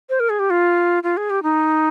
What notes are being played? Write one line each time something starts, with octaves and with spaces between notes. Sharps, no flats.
C5
A#4
G#4
G4
F4
F4
G#4
G4
D#4